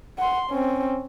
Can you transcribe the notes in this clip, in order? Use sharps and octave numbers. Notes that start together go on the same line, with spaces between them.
F#5 C6
C4 C#4